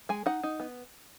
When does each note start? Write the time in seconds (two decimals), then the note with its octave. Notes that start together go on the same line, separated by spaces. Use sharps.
0.09 G#3 G#5
0.26 D#4 F#5
0.43 D#4
0.60 B3